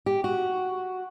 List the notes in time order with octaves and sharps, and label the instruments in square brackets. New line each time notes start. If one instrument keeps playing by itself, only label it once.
[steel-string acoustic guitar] G4
F#4